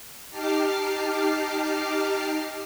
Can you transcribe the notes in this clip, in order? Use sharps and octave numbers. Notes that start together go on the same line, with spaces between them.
D#4 G4 A5 D6 F6 C7